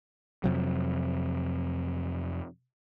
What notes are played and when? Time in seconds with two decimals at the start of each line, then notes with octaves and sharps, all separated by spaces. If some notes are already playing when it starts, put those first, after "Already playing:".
0.44 F2 C3 F#3